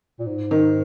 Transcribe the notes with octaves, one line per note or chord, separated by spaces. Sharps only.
A#2
G#2
D#3